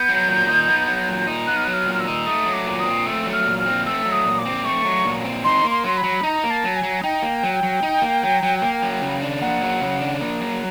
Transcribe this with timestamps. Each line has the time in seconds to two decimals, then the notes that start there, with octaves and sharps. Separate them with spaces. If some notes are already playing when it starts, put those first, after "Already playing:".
Already playing: B3 G6
0.09 F#3
0.28 A#2
0.48 D#4
0.68 B3
0.88 F#3
1.08 A#2
1.27 D#4
1.47 B3 F#6
1.56 F6
1.65 F#3 F#6
1.74 F6
1.86 A#2
1.95 F6
2.00 E6
2.07 D#4
2.26 A3 D#6
2.46 F#3
2.53 D6
2.67 A#2
2.80 D#6
2.86 C4
3.06 A3 E6
3.26 F#3
3.33 F6
3.46 A#2
3.59 F6
3.66 C4
3.86 A3 E6
4.05 F#3
4.12 D#6
4.26 A#2
4.38 D6
4.45 C4
4.64 A3 C#6
4.85 F#3
5.05 A#2
5.25 C4
5.44 D#4 C6
5.64 A#3
5.71 C6
5.84 F#3 C6
5.97 B5
6.04 F#3
6.23 D#4 A#5
6.44 A#3
6.50 A5
6.64 F#3
6.76 G#5
6.83 F#3
7.03 D#4 G5
7.22 A#3
7.43 F#3
7.63 F#3
7.83 D#4
8.02 A#3
8.23 F#3
8.43 F#3
8.62 A#3
8.82 F#3
9.02 C#3
9.22 D4
9.41 A#3 F#5
9.61 F#3
9.81 C#3
10.01 D4
10.21 A#3
10.41 F#3